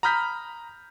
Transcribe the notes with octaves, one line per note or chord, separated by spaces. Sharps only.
A#5 B5 D#6 F6 G6 B6